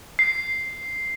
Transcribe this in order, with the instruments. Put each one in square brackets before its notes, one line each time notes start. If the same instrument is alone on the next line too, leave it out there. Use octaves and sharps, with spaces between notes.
[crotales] C7